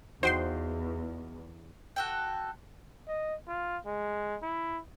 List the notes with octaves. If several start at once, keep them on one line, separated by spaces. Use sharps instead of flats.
E2 D#4 F#4 C5 F5 G5 C6
F#4 A4 G5
D#5
F4
G#3
E4